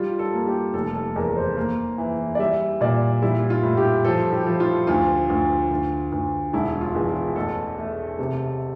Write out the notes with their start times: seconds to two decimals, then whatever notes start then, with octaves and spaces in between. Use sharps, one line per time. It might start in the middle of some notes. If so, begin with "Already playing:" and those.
Already playing: G3 F4
0.19 A4
0.33 A#3
0.47 G4
0.74 F1 A4
0.94 A4
1.16 E2 A#4
1.36 C5
1.57 A#3
1.98 E3
2.35 D5
2.39 G3 E5
2.81 A#2 D5
3.22 G3 E4
3.50 F4
3.63 A2
3.77 G4
4.04 F3 A4
4.32 G4
4.47 F3
4.60 F4
4.87 D2 F4
5.30 D2
5.71 D2
6.12 D2
6.53 E1 E4
6.81 F4
6.95 E2
7.09 F4
7.36 A1 A4
7.78 A3
8.19 C3